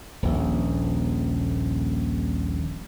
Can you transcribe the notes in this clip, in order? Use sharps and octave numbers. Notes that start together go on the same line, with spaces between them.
D#1 A#1